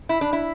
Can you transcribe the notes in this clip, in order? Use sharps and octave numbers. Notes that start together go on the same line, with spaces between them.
E4
D4
E4